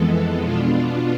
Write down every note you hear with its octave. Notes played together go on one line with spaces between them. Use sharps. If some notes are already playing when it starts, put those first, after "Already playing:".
Already playing: F2 E3 G#3 B3 A4
B2 B3 D4 F4